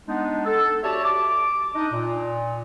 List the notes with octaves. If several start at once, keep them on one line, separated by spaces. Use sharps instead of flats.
G#3 B3 D4 D#4
A4
F#4 G4 C#5 D5 E5 A5
D6
D4 D#4 D#5
A#2